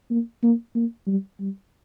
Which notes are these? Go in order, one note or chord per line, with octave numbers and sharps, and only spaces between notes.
A#3
A#3
A#3
G3
G3